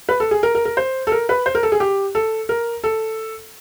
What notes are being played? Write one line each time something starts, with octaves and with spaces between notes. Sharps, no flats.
B4
A4
G#4
A#4
A#4
A#4
C5
A4
A#4
B4
C5
A#4
A4
G#4
G4
A4
A#4
A4